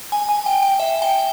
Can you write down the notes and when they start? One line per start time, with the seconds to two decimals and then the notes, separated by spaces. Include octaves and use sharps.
0.12 G#5
0.29 G#5
0.46 G5
0.62 G5
0.79 E5
1.02 G5